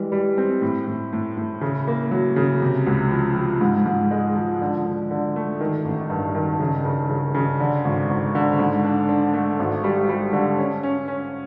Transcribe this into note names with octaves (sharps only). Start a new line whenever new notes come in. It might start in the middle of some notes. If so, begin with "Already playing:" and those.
Already playing: E3 G3 G#3
G3
C4
A2
A2
A2
A2
C#3
A#3
F#3
C#3
C3
C#2
F3
F3
G#2
G#2
G#3
F3
D3
D3
D3
A3
D#3
A1
G2
D#3
C#3
C#3
C#3
C#3
D3
G#1
G#1
D3
G#2
D4
D4
A3
G#1
G3
G3
D3
C#4
C#4
C#4